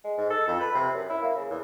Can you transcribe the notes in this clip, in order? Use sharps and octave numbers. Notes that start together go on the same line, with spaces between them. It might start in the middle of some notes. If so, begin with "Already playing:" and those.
G#3
G#2
A4
F2
B4
C3
F#2
E4
A#3
C#3
E2